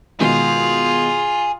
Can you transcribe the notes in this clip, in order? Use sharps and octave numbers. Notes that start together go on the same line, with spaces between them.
B2 D#3 G#3 F4 G#4